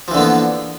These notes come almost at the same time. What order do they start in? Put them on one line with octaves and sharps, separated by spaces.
F3 E3 D3 A#3 B3